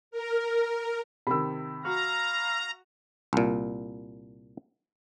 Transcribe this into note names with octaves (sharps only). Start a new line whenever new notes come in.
A#4
C3 D#3 B5 E6
F#4 F5 A#5
C2 A#2